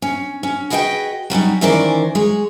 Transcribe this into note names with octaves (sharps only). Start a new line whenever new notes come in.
C#4
C#4
F#4 G#4 B4 D#5 F5 G5
F#3 G3 C#4 D#4
D#3 E3 C#4 A#4 C5 D5
G#3 C#5